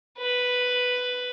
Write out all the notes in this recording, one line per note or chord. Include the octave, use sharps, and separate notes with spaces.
B4